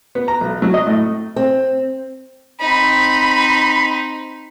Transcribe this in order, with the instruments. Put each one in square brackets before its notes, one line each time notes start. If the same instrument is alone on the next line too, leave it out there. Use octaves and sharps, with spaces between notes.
[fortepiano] B3
A#5
B1
F#3
D#5
A2
[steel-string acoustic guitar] C4
[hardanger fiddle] C4 D#4 [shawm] B5